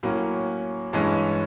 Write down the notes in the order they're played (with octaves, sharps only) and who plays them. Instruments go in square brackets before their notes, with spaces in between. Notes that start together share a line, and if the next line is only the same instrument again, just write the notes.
[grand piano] A2 F#3 A#3 C#4
G2 E3 G#3 C#4